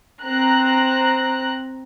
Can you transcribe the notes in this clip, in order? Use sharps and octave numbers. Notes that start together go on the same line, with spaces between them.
C4 A#5 F#6